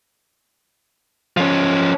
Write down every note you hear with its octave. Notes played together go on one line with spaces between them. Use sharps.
F3 C#4